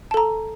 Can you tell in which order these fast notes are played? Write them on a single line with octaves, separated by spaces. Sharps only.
A5 A4 A#5